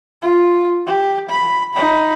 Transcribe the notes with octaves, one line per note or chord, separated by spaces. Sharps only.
F4
G4
B5
D#4 B5